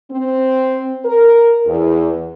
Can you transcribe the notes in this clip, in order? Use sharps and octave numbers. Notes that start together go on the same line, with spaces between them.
C4
A#4
E2